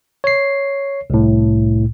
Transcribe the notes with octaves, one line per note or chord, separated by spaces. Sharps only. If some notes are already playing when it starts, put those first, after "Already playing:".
C#5 C7
C2 A2